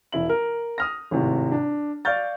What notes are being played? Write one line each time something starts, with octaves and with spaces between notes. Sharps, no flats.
E1 E4 F#7
A#4
D#6 F6 A#6
G#1 A2 C3
D4
D5 F5 C#6 F6 G6 A6